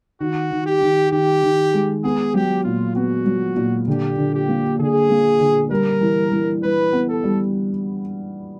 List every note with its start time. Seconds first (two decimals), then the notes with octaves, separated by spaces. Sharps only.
0.20 D#3 F#4
0.51 D#3
0.66 G4
0.81 D#3
1.12 D#3 G4
1.43 D#3
1.73 G#3
2.04 B3 G#4
2.34 F#3 G4
2.64 A#2 F4
2.95 B3 F#4
3.26 F#3
3.57 A#2
3.88 D3 G4
4.18 D3
4.34 G4
4.49 A#3
4.79 D3 G#4
5.10 A#3
5.40 D3
5.71 G3 A#4
6.01 E3
6.32 E3
6.62 E3 B4
6.93 B3
7.08 A4
7.24 G3